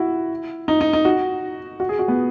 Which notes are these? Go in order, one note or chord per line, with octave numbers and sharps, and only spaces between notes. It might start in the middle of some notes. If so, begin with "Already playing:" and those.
Already playing: E4 F#4
D#4
D#4
D#4
F#4
F#4
G#4
F#4
B3